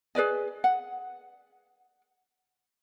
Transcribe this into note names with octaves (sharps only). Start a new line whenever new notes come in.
G#4 B4 D5 D#5
F#5